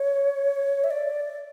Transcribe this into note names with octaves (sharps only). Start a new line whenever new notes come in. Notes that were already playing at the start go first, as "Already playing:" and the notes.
Already playing: C#5
E5
D5